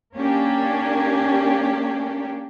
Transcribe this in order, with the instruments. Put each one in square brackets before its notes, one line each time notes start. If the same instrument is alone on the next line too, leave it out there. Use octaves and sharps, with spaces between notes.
[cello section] A#3 C#4 D4 G4